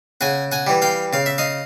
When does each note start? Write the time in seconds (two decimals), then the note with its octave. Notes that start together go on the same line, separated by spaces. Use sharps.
0.21 C#3 F#5 G#5
0.52 F#5 G#5
0.67 E3 G3
0.82 F5 G5
1.13 C#3 F5
1.26 E5
1.38 D#5 F5